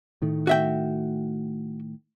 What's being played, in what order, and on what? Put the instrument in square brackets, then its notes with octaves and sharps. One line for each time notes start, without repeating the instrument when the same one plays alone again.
[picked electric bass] A2 D#3 A3
[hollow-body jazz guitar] F#4 E5 G5